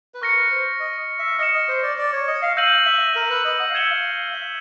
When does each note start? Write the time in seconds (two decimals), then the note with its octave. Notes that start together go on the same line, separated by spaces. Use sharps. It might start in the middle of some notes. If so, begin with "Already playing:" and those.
0.14 B4
0.22 A#4 C#6 F6 A#6 C#7
0.36 B4
0.51 C5
0.80 D#5
1.19 E5
1.39 D#5 F6 A#6 C#7 E7
1.54 D#5
1.69 C5
1.83 D5
1.98 D5
2.13 C#5
2.27 D#5
2.42 F5
2.57 F5 E6 G6 A#6 D#7 F#7
2.86 E5
3.16 A#4
3.30 B4
3.45 D#5
3.60 F#5
3.69 F5
3.74 E5 G#6 C#7 E7 G7
3.89 F5
4.33 E5